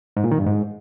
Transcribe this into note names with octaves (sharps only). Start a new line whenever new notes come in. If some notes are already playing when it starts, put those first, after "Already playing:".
G#2
A#2
D#3
G2
G#2